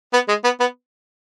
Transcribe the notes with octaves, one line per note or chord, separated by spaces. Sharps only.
B3
G#3
B3
B3